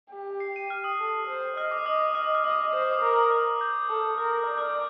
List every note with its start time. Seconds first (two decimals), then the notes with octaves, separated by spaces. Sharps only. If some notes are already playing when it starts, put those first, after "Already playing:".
0.11 G4
0.40 C7
0.56 D#7
0.70 F6
0.84 D#6
0.99 A4
1.28 C5
1.57 D#5 F6
1.71 D6
1.86 D#5 D#6
2.15 F6
2.24 D#6
2.35 F6
2.44 D#5 D#6
2.73 C5 D#6
2.82 D6
2.93 D#6
3.02 A#4 D6
3.16 D#6
3.32 F6
3.61 G6
3.89 A4
4.18 A#4 F6
4.33 D#6
4.47 D5 G6
4.58 F6
4.67 D6